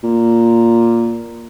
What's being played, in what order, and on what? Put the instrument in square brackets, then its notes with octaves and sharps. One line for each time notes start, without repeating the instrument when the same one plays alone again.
[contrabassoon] A#2